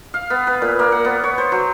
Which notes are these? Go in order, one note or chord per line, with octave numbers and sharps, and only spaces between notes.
F5
B3
B4
A#2
A#3
F#5
B3
C#5
C5
F#3